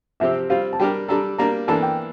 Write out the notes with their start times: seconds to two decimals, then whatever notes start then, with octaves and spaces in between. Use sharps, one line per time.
0.20 C3 F3 C4 G4 E5
0.50 G3 C4 F4 F5
0.73 A5
0.80 G3 D4 G4 A#4 G5
1.08 G3 D4 A4 A#5
1.38 G3 A#3 D4 A#5
1.68 E3 A#3 D4 A4 A5
1.82 G5